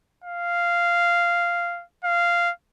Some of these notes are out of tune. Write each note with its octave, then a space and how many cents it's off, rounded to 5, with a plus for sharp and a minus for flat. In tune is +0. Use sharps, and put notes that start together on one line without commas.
F5 -10
F5 -10